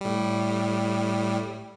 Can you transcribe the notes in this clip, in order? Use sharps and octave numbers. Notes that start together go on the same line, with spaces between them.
A2 G3